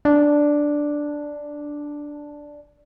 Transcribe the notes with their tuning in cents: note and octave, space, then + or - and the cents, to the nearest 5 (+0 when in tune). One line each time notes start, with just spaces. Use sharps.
D4 +0